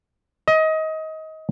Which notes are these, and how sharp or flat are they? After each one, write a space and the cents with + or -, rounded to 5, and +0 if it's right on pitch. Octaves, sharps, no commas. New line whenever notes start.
D#5 +25